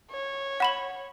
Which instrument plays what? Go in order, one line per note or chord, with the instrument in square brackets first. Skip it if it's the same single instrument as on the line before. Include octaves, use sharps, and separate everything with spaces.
[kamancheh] C#5
[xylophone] F#5 B5 F#7